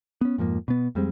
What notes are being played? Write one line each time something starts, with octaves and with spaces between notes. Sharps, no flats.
B3 C#4
F2 G#2 F3 A#3
B2 B3
F2 G3 G#3 C4